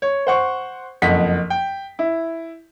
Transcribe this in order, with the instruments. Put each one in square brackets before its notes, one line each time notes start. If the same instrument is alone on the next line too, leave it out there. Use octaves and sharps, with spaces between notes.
[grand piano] C#5
C5 F#5 C#6
F#1 F2 D#5 F#5 B6
G5
E4